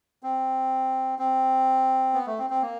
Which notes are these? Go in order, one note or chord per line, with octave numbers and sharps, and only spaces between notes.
C4
C4
B3
A3
C4
C4
A#3